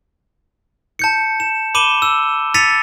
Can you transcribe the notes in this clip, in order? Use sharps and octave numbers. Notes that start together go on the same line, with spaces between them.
A5 G6 C#7
E7
B5 D6 D#7 E7 G7
E6
E6 A6 B6 C#7 D#7 F7